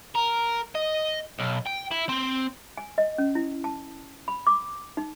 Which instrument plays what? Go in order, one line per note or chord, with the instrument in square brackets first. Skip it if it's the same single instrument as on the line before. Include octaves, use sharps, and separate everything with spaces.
[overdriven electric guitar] A#4
D#5
B1
G5
E4
C4
[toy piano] G#5
D#5
C#4
E4
A5
B5
D6
D#4